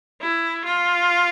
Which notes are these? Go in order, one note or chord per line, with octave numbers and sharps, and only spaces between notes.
E4
F4